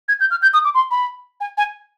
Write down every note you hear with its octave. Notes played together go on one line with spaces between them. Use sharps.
G#6
G6
F6
G6
D#6
D6
C6
B5
G#5
G#5